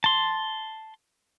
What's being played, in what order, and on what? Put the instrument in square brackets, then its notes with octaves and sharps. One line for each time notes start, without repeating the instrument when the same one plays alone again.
[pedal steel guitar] A5 C6